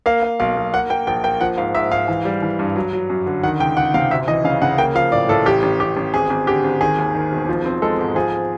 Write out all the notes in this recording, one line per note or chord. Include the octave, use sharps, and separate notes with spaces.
A#3 F5
A#3
B1 F5
B1
A#3 F#5
A#3 G5
A#1 G5
A#3 G5
F3 F#5
G#2 F5
G#2 E5
G#2 F5
E3
G3
E3
G2
F#3
F#3
F#2
D3
D#3 F#5
C#2 G5
C#2 F#5
C3 F5
D2 E5
E3 D#5
C#3 F5
C#3 F#5
A#3 G5
F3 F5
A2 D5
A2 A4
A1 G4
A1
A1 G4
A1
G#1 G#4
G#1
D3 G4
G#1
D#3 G#4
D#2
D#3
E1
F3
C4
G#3 A4
G#2
F3 G#4